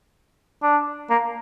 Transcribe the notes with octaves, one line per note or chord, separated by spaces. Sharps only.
D4
A#3